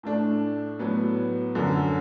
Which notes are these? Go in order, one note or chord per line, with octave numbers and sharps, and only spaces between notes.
A2 A3 D4
A2 F#3 B3
F#2 D3 F#3